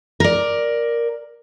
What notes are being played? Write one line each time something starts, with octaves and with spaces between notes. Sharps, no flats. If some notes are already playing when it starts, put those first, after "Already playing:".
A#4 D5